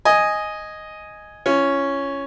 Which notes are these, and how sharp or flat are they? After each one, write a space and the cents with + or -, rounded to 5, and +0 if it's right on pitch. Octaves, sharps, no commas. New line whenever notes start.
D#5 +0 G#5 +0
C#4 +0 F4 -40